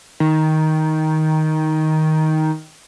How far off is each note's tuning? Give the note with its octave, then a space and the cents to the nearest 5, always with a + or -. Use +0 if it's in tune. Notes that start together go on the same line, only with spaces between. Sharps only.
D#3 +10